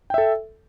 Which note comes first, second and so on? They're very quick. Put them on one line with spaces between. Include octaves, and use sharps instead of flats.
G5 E5 A4